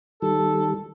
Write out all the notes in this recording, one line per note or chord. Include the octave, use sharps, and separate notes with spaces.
D#3 G3 A4